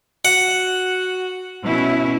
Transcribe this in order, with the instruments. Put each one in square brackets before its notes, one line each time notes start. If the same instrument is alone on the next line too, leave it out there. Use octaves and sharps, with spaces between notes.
[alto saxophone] F#4 [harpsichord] F#5
[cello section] B2 C#4 E4